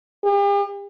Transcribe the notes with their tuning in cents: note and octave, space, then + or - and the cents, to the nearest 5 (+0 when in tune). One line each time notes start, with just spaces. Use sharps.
G4 +45